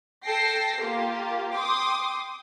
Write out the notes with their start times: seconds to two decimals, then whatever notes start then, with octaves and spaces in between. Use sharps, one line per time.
0.23 A4 G5 A#6 C7
0.79 A#3 F4 G4
1.52 G5 C6 D6 D#6